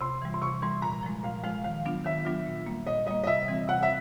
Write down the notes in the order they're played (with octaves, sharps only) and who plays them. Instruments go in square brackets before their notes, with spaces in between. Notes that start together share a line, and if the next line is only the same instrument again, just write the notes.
[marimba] C3 [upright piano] C6
[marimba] E3 G3
[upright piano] C6
[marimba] C3 [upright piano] C#6
[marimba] E3 G3 [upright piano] C6
[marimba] A#2 [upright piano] A#5
[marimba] F3 G#3
[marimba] A#2 [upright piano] F5
[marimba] F3 G#3 [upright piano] F5
[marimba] D#3 [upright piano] F5
[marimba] F#3 B3 D4 F4
[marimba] D#3 [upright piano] E5
[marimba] F#3 B3 D4 F4
A#2
G3 A#3
[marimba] A#2 [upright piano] D#5
[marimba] G3 A#3 [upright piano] D#5
[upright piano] D#5
[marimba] C3 [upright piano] E5
[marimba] E3 G3 C4
[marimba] C3 [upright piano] F#5
[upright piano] E5